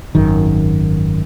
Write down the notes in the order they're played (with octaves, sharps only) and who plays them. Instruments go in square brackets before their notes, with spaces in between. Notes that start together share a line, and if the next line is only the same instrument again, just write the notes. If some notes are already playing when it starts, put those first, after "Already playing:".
[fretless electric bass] G#1 F#2 D#3